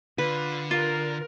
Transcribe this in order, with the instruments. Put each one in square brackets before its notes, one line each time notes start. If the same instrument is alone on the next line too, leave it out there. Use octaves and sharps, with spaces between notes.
[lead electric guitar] D3 [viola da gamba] F4 [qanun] B4
[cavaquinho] F4 [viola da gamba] A#4